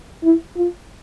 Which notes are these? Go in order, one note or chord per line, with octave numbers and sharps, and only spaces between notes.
E4
F4